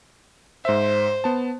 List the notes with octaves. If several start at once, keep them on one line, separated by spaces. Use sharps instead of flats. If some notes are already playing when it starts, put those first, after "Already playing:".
G#2 C5 E5
B3 A5